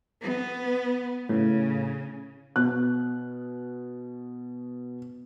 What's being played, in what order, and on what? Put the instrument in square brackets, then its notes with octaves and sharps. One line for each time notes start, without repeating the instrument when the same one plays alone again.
[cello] B3
[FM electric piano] A2 [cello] C#3
[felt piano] B2 F#6